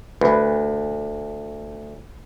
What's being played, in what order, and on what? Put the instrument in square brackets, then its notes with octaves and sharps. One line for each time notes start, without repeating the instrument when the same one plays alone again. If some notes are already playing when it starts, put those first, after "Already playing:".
[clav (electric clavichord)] D2 [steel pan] B4